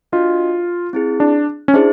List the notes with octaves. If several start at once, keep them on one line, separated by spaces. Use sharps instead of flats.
D4 F4 F#4 A#4 D#5
C4 E4 G#4
D4
C#4
D4 E4 G#4 C5 E5